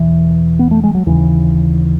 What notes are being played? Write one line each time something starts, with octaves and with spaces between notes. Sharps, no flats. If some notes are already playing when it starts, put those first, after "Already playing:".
Already playing: E2 B2 E3
B3
A3
G#3
F#3
D#2 C#3 E3